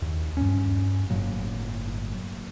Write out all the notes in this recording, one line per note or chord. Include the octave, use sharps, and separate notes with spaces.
D#2
G2 C#4
G1 A2 F#3 A#3